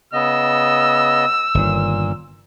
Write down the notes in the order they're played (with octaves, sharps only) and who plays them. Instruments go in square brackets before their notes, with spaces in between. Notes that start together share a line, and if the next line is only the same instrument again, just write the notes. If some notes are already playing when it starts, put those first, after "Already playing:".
[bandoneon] C#3 B3 D#5 [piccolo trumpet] E6
[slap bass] G1 D#3 [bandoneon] A#2